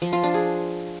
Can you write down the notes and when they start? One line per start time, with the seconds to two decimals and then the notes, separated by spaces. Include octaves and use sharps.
0.02 F3
0.13 F4
0.23 D4
0.34 G#4